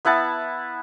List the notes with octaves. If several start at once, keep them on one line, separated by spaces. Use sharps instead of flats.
B3 E4 F#5 A5